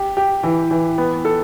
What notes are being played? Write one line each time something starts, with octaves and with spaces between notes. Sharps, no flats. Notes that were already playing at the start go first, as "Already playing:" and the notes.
Already playing: G4
G4
E3
E3
B3
A4